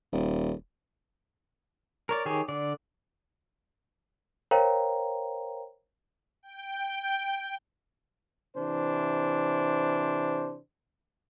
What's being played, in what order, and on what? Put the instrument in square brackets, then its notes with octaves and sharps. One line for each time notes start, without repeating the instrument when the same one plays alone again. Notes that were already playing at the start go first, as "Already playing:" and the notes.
[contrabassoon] D#1
[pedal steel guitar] A#4 C#5 D5
D#3 G4 G#4 C#5
D3 D5
[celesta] A#4 C5 C#5 F5 G5 A#5
[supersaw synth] G5
[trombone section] C3 E3 D4 C5